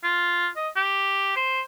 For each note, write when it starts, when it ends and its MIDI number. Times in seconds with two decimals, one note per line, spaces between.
0.03 0.48 65
0.56 0.68 75
0.76 1.34 67
1.36 1.61 72